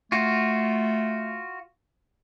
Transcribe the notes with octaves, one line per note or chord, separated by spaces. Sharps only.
A3 F4 F#4